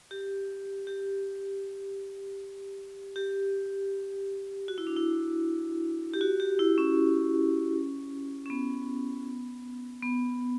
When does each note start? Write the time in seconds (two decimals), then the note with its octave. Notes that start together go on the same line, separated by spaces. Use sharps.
0.11 G4
0.87 G4
3.16 G4
4.68 F#4
4.78 E4
4.87 D4
4.97 E4
6.14 G4
6.21 F#4
6.40 G4
6.59 E4
6.78 C#4
8.46 C#4
8.50 B3
10.03 B3